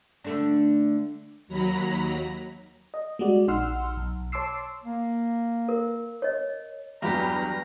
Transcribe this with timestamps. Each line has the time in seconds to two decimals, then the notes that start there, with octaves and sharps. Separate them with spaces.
0.24 D3 A3 D4
1.48 D#2 F#3 A#5 B5
2.94 D#5
3.19 G3 G#3 F#4 D5
3.48 A#1 D#4 F#5 C6 E6 F6
3.97 B1
4.32 C#5 A5 C6 D6 E6 C7
4.83 A#3
5.69 A#4
6.22 C#5 D#5
7.02 E2 G2 F#3 G4 B4 A#5